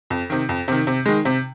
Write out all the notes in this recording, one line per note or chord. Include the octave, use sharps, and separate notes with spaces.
F2
C3 D#3
F2
C3 D#3
C3
D#3 G#3
C3